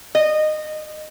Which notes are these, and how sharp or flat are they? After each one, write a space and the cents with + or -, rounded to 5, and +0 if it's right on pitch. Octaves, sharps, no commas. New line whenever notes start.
D#5 -20